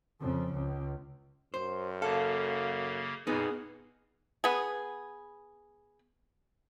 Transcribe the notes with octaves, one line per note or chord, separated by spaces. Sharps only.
F2 C#3
C#2
F#2 C5
C#3 A#3 A4 F5
F2 A#2 B3 D#4 G#4
B3 G#4